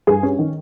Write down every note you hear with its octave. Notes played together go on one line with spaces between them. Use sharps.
G2 G#4 G#5
C#4
D#3